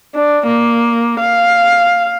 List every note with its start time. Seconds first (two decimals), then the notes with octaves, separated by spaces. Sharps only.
0.14 D4
0.47 A#3
1.20 F5